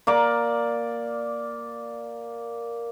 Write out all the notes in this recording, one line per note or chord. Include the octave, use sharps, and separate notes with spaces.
A#3 D5 D6